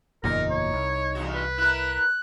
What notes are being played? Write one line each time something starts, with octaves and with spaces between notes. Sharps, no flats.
F#1 E2 A#2 D#4 A#4
C#5
C2
E2 G2 F#4
B4
E4 A#4 F#6